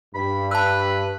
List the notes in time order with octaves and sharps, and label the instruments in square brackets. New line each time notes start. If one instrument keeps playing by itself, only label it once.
[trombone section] G2 [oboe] B5
[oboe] B4 [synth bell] A5 E6